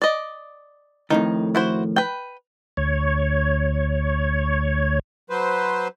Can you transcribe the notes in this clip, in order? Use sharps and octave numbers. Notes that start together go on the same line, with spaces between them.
D5 D#5
F2 A2 D#3 D#4
E4 F#4 C5
B4 G5
D2 C#5
F#3 B4 C5